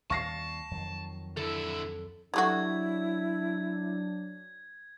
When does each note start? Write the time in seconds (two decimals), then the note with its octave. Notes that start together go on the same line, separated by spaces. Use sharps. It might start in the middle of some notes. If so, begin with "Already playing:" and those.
0.10 D#2 G3 F5 A5 C#6 A#6 C7
0.71 F2 D#3 F#3
1.37 D3 E4 A4
2.34 F#3 G3 A3 D4 E4 F#4 G#6